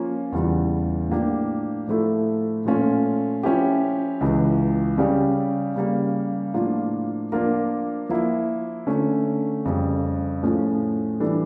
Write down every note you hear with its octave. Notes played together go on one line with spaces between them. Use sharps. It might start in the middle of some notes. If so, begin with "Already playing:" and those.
Already playing: F3 A#3 C#4 F4
E2 C#3 E3 G3
A2 F3 A#3 D4 G4
A2 F3 A3 E4 A4
A#2 F3 A3 C#4 F4
F3 C#4 E4 G4
C#2 C#3 E3
C#3 G3 C#4 G4 D5
C#3 G3 A#3
A2 F3 A#3 D4 F4
F3 A#3 D4 F4 A#4
F3 A#3 E4
D3 A3 C#4
F2 C#3 G3
A2 F3 A3 C#4
E3 G3 D4 A4